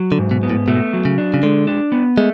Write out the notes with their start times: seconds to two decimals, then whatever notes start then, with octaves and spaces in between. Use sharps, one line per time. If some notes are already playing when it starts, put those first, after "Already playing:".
Already playing: F#3
0.12 D3
0.18 G#2
0.31 B2
0.43 B3
0.50 A2
0.68 B2 A3
0.93 F#3
1.05 C#3
1.18 D4
1.34 C#3
1.43 D3 G#3
1.67 D4
1.92 B3
2.18 G#3 A3